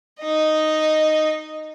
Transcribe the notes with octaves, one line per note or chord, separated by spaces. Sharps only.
D#4 D#5